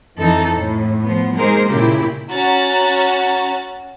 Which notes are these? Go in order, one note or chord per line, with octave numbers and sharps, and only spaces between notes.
F2 E3 D#4 A4
A2
F3 B3
G#3 A#3 D#4 G#4 A#4 C5
A#2 C#3 E4 G4
C#4 F#4 A#5 F#6 A6